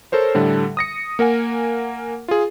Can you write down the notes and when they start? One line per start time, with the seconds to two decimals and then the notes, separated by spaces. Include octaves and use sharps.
0.12 A4 A#4 C5 C#5
0.35 A2 D3 G3 A4
0.77 D#6 A#6 C#7
1.19 A#3 A#4 F#5 G#5
2.28 F4 G#4